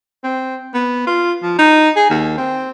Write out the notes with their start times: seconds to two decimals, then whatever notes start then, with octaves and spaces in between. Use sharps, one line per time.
0.24 C4
0.74 B3
1.07 F4
1.43 F3
1.59 D#4
1.96 G#4
2.10 D#2
2.38 C4